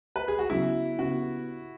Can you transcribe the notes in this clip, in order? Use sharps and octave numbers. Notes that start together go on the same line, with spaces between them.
B4
G#4
F#4
C#3 F#3 B3 E4
C#3 B3 F#4